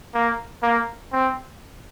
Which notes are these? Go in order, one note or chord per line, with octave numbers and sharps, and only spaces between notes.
A#3
A#3
C4